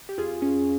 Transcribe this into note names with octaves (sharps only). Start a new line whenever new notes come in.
G4
F2 F4 G#4
C#4